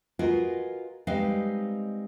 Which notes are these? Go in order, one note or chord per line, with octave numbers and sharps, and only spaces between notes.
F4 F#4 G#4 A#4 B4 D#5
G3 G#3 C4 D#4 B4 F5